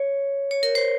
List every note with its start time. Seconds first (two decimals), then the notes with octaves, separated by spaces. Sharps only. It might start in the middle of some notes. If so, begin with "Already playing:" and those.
Already playing: C#5
0.51 C#5
0.63 A#4
0.75 C5